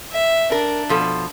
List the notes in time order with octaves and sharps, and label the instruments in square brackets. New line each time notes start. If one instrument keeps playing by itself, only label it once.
[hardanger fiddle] E5
[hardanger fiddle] D4 [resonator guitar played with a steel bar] A#4
[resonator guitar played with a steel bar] B2 F3 A4